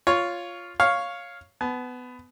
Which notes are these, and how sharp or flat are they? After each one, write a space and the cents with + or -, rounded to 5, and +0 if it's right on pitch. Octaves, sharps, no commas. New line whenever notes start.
F4 +0 C#5 +10
C#5 +0 F5 +0
B3 +20 A5 -40